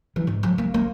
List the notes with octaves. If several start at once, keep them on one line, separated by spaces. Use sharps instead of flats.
E3
G#2
F3
A#3
A#3